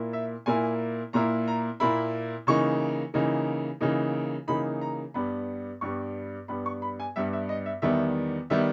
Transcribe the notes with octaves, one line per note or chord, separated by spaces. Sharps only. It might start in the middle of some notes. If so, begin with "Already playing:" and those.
Already playing: A#2 A#3 E4
E5
A#2 A#3 E4 G#5
A#2 A#3 E4 A#5
A#5
A#2 A#3 E4 B5
C#3 E3 A#3 D#4 C#6
C#3 E3 A#3 D#4
C#3 E3 A#3 D#4
C#3 E3 A#3 D#4 B5
A#5
G2 G3 B3 B5
G2 G3 B3 C#6
G2 G3 B3 B5
C#6
B5
G#5
G2 G3 B3 E5
E5
D#5
E5
E2 D#3 G3 B3 E5
D#3 G3 B3 E5